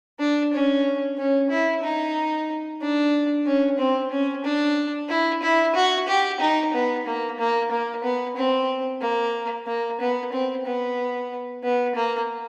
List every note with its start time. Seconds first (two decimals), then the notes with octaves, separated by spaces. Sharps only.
0.19 D4
0.53 C#4
1.18 C#4
1.50 E4
1.83 D#4
2.81 D4
3.46 C#4
3.79 C4
4.11 C#4
4.44 D4
5.09 E4
5.42 E4
5.75 F#4
6.08 G4
6.40 D#4
6.73 B3
7.06 A#3
7.39 A#3
7.71 A#3
8.04 B3
8.36 C4
9.01 A#3
9.67 A#3
10.00 B3
10.32 C4
10.66 B3
11.63 B3
11.95 A#3